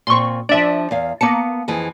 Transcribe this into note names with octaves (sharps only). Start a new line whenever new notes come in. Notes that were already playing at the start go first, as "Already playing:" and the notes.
A#2 C4 C6 C#6
F3 D4 D5 E5
E2 F5
A#3 B3 F5 A5 C#7
F2 E3 G#4